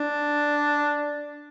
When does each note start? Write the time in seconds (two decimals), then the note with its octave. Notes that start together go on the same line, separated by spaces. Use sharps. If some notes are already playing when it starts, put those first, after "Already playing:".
Already playing: D4